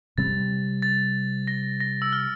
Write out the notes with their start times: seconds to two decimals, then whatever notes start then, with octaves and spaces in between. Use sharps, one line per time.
0.18 C3 G3 C4 A6
0.82 A6
1.47 A#6
1.80 A#6
2.02 E6
2.13 F6